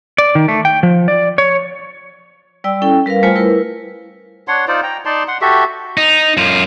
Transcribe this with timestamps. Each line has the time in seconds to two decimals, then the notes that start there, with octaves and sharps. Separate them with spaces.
0.18 D5
0.35 D#3
0.48 A3
0.65 G5
0.83 F3
1.08 D5
1.38 C#5
2.64 G3 D5 G5 E6
2.82 C#4 E4 A4 G5
3.06 G3 A#4 B4 F5
3.23 G3 A3 F4 C5 G#5
3.36 E4 A#4 B4
4.48 D4 C#5 F#5 C6
4.68 D#4 F4 C5 D5
4.83 G5 A#5
5.05 D#4 D5 A5 C6
5.28 F#5 C6
5.41 F#4 G4 A4 E5
5.97 D#4
6.37 F#2 F4